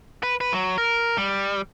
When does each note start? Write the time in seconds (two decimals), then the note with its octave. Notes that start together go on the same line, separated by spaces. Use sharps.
0.23 B4
0.41 B4
0.53 F#3
0.78 A#4
1.18 G3